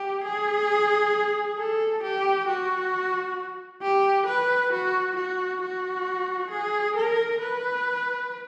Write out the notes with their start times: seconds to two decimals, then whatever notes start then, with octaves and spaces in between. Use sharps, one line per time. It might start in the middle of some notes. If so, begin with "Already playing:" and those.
Already playing: G4
0.24 G#4
1.58 A4
2.03 G4
2.48 F#4
3.82 G4
4.26 B4
4.72 F#4
5.16 F#4
5.61 F#4
6.50 G#4
6.95 A#4
7.40 B4